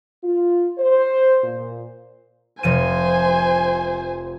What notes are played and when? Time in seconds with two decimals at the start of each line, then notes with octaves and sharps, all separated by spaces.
0.24 F4
0.78 C5
1.43 A#2
2.63 F1 F3 C5 G#5 D#7